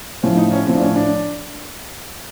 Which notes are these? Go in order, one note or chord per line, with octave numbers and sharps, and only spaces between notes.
A2 F3 C#4
D#4
C#4
A2 F3 C4
D4
C#4
D4